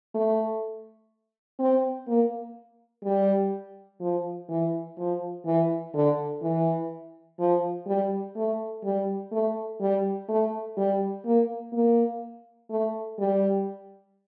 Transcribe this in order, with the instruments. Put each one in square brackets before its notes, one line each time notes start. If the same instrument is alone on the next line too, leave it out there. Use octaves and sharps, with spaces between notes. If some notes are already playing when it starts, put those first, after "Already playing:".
[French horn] A3
C4
A#3
G3
F3
E3
F3
E3
D3
E3
F3
G3
A3
G3
A3
G3
A3
G3
A#3
A#3
A3
G3